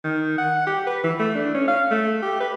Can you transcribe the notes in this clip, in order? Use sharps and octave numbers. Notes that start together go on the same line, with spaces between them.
D#3
F#5
G4
B4
E3
A3
D4
C#4
F5
A3
G4
B4